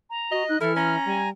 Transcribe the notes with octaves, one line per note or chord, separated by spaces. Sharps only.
A#5
F#4 D#5
D#4 F#6
E3 E4 A4 F6
C#4 A#5
G3 G#5